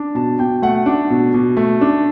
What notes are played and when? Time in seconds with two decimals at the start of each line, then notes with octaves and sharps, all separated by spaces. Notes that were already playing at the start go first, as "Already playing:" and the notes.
Already playing: D4
0.15 B2 A5
0.39 B2 G5
0.62 A3 F#5
0.86 D4
1.10 B2
1.34 B2
1.57 A3
1.81 D4